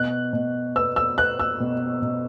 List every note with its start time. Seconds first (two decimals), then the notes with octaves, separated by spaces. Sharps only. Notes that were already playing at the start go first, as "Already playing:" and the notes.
Already playing: B2 F#6
0.33 B2
0.76 B3 E6
0.96 E6
1.18 B3 F#6
1.40 E6
1.60 B2
2.02 B2